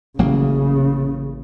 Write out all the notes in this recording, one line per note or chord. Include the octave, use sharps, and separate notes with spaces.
A1 C#3 F#3 A#3